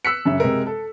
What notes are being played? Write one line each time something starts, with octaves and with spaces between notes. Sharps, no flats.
E6 F#6 B6 C#7
F#2 C#3 E5
C3 G#3 A#4
A4